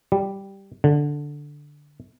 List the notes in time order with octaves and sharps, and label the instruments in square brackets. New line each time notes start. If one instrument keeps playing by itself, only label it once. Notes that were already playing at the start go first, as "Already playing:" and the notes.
[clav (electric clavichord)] G3
D3